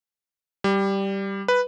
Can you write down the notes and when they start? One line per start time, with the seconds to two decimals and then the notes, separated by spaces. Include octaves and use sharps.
0.64 G3
1.48 B4